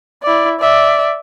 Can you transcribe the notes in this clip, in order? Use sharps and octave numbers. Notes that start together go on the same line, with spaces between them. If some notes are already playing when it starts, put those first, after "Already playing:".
E4 D5
D5 E5